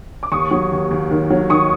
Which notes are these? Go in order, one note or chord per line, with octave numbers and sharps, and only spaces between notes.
D6
D#2 C#6 D#6
F#3
D#2
D#2
D#3
F#3
D#3 C#6 D#6